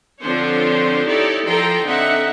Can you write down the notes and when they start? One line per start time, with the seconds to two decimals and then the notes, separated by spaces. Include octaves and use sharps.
0.22 D3 F3 C4 D4 C5 C#5
1.07 D#4 E4 G4 A4 C#5 D5
1.46 F3 A4 G5 A#5 C6
1.85 D3 C4 D#4 E5 F#5